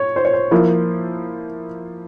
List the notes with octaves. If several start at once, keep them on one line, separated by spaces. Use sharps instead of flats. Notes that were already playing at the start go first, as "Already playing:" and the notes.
Already playing: C#5
C5
C#5
C5
F3 A#3 E4